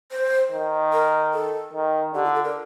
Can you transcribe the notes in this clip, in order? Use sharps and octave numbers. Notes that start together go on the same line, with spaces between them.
C5
D#3
A#4
A4
D#3
D3 G4
F4
A4
A#4